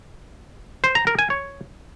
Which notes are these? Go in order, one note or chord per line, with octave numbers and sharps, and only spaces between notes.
C5
A#5
A#4
G#5
C#5